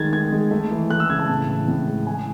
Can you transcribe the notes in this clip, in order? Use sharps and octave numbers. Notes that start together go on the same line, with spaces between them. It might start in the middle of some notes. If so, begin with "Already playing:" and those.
Already playing: D#3 G#3 A3 G#6 A6
D#3 G#6
G#3
A3
E3
A3 F#6
E6
C#3 G#6
A5
A2
E3
A2
G#3
G#3 G#5